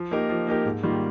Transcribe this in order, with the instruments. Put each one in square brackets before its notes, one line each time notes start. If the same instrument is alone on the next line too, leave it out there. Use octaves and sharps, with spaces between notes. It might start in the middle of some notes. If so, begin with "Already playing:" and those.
Already playing: [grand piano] F3
A#3 D#4 G4 A#4
F3
A#3 D#4 G4 A#4
G#2
D#3 G3 A#3 F4